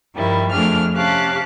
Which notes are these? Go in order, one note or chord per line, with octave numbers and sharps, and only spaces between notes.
G2 D#3 F3 G3 E4
F2 F3 A3 D4 G#4 F6
C3 C#4 G4 F5 A5 F#6